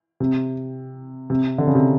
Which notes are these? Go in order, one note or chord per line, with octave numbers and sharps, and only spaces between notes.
C3
C3
D3
C#3
C3